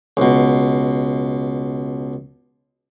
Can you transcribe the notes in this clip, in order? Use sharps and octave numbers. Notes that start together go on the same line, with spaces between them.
C#2 B2